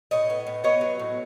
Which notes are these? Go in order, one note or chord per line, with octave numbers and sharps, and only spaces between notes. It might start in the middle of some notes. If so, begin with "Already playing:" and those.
A2 C#5 D#5
B3
A2
B3 C#5 D#5
F#3
A2